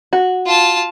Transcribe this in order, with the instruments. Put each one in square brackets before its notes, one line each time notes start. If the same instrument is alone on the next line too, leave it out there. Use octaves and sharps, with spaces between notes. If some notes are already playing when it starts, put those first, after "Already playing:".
[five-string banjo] F#4
[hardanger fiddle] F4 A5